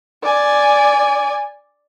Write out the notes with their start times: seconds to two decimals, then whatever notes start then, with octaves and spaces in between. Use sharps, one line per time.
0.23 D5 G#5